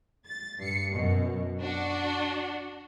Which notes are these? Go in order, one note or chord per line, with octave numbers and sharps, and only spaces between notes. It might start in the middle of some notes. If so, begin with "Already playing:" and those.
A6
G2 C7 C#7
F#2 B2
D4 F#4